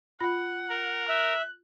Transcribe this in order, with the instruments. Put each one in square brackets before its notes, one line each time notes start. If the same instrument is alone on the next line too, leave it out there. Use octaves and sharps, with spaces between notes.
[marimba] F4 B5 A#6 [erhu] F#5
[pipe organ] A#4
[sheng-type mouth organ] E5 [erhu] F#6